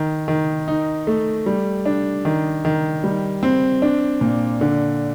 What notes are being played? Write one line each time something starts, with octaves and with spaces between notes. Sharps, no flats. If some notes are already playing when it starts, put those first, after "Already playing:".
Already playing: D#3
D#3
D#4
A3
G3
D4
D#3
D#3
G3
C4
D4
A#2
D3